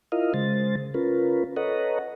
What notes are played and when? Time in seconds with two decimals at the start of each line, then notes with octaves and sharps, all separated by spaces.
0.12 E4 F4 A#4 D#5 F5
0.34 C#3 G#3 C5 A6
0.94 C#4 F4 A#4 B4
1.56 A4 B4 C#5 D#5 F#5 A#5